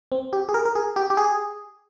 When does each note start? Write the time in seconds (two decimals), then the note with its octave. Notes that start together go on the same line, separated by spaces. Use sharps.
0.12 C4
0.33 G4
0.49 G#4
0.54 A#4
0.65 A#4
0.75 G#4
0.96 G4
1.10 G4
1.17 G#4